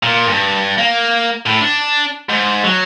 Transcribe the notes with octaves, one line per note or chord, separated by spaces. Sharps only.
A#2
G2
A#3
A2
D4
G#2
F#3